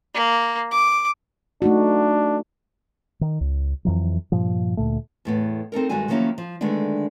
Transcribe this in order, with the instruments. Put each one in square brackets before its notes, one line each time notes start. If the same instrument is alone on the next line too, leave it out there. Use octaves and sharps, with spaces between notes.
[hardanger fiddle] A#3
D6
[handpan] A3 D#4 F#4 [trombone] D4
[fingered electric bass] D#3
C#2
F2 E3 F#3
G2 A#2 F3
D2 A#2 A3
[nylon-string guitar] E2 A2 B3
C4 D#4 A4 A#4
G2 D#3 G3 G#3 F#4 G#5
D#3 F3 F#3 A#3 C#4 E4
F3
D3 D#3 G#3 A3 B3 D4